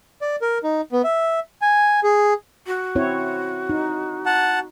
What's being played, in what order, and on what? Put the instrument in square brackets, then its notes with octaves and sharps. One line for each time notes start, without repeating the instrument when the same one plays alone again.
[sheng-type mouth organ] D5
A#4
D#4
B3
E5
G#5
G#4
[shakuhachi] F#4
[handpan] C4 E4 C#5
D#4
[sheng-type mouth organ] F#5 A5